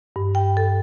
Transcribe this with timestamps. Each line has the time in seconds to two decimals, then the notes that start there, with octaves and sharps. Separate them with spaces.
0.16 G2
0.35 G5
0.57 A4